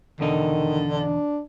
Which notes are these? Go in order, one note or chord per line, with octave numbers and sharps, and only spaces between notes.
E2 B2 D3 D#3 D#4
D4